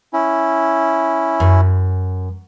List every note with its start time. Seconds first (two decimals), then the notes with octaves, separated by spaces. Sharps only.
0.13 C#4 E4
1.40 F#2